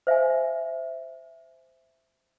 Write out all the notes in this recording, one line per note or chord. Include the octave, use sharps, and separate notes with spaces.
C5 E5 F5 G#5
E5